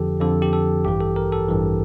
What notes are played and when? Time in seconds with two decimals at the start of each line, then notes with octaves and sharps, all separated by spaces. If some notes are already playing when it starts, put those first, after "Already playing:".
Already playing: F2 D3 F3 G4 A4
0.21 F2 D3 F3 A4
0.42 G4
0.53 A4
0.85 A1 G2 E3 G4
1.01 A4
1.16 A#4
1.32 A4
1.48 A1 G2 E3